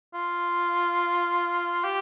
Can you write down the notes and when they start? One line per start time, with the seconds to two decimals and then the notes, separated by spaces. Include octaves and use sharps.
0.14 F4
1.84 G4